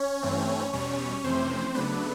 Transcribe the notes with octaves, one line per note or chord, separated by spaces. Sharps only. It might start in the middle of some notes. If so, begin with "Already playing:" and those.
Already playing: C#4 C#5
G2 E3 A3 C4
E2 B2 G3 C#4 C#5
F2 C3 E3 A3 C4 C#4 C5
C#3 F#3 A3 B3 D4 B4